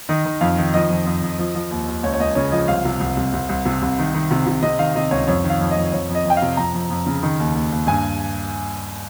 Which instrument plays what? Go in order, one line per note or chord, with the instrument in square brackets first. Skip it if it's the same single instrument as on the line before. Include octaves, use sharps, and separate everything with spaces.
[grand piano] D#3 D#5
D#3
F2 F5
D#3
F3 D#5
F2
F2
F2
F3
F3
D#2
D#2
C#2 C#5
C#5
C#2 D#5
C#3 C#5
F3 D#5
C2 F5
C3
C2
C2
C2
C2
C3
C2
D#3
D#3
C3
C3
C3 D#5
D#3 F5
C3 D#5
C#2 C#5
F2 C#5
D#3
F5
F2
D#5
F2
F2 C#5
F2
D#5
F2 G5
F5
C3
F2 A#5
F2
F2
C#3
D#3
D#2
D#2
D#2
G2 G#5